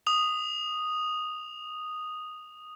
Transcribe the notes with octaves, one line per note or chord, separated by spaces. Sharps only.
D#6 F7